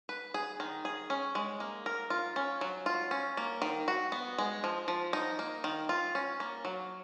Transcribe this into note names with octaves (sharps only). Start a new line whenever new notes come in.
B4
G#4
D#3
G#4
C#4
G#3
A#3
A#4
F4
C#4
F#3
F4
C#4
A#3
D#3
F#4
B3
G#3
F3
F3
D#4
A#3
D#3
F4
C#4
A#3
F#3